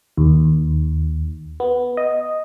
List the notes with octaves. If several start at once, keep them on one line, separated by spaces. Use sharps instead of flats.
D#2
B3
D#5